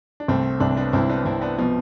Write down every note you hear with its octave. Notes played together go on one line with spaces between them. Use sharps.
D4
C2 A3 C4
C2 D4
C4
B3 D4
C2 C4 E4
B3 D4
C2 C4 E4
B3 D4
B2 F3